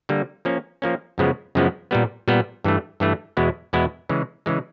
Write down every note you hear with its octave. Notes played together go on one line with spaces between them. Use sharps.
D3 G3 A#3
F3 A#3 C#4
F3 A#3 C#4
F#2 C#3 F3 G#3 B3
F#2 C#3 F3 G#3 B3
A#2 G3 B3
A#2 G3 B3
G2 E3 A3
G2 E3 A3
E2 B2 G#3 B3 E4
E2 B2 G#3 B3 E4
C#3 E3 G#3
C#3 E3 G#3